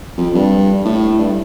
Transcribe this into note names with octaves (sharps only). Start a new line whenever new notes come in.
F2
G2
A2
G2